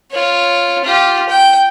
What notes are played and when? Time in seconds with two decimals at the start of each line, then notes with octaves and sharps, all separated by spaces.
0.11 F4 C#5
0.84 F4 G4
1.29 G5